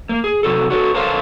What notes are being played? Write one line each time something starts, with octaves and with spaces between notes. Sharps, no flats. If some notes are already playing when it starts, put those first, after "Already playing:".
A#3
G#4
C3 F#3 A4
F#4 A4 C#5
A4 A#4 C5 C#5 F5 A5